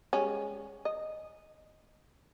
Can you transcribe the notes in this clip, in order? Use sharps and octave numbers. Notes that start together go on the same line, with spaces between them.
G3 G#3 C#4
D#5